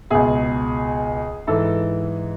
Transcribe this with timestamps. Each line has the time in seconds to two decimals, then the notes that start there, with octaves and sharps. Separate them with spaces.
0.10 C#2 B2 G#4
1.47 G#2 E3 A4